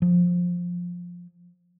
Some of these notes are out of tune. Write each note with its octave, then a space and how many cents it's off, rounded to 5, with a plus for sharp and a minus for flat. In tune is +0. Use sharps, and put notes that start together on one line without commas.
F3 +15